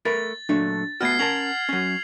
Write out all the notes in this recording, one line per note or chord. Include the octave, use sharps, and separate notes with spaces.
A3 A#4 B4 A6
A#2 F#3 A3 D4
A3 B3 F#4 F#5 F6 G#6 C7
C#4 A#4 A5 G#6 F7 F#7
F#3 C#4